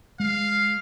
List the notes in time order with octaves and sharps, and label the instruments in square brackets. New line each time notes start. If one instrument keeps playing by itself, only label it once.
[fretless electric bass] G#3 [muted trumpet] F5